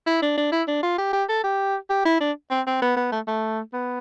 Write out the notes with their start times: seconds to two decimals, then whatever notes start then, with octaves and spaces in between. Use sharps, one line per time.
0.07 E4
0.22 D4
0.38 D4
0.52 E4
0.68 D4
0.83 F4
0.98 G4
1.13 G4
1.29 A4
1.44 G4
1.90 G4
2.05 E4
2.21 D4
2.51 C4
2.67 C4
2.82 B3
2.96 B3
3.12 A3
3.28 A3
3.73 B3